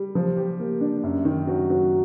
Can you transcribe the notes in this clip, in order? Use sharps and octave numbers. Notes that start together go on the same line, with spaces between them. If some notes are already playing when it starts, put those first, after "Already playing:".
Already playing: G3
F3
G4
A#3
D4
F#2
D#3
F#3
F#3